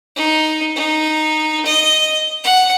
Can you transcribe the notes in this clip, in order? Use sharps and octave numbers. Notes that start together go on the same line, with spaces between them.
D#4
D#4
D#5
F#5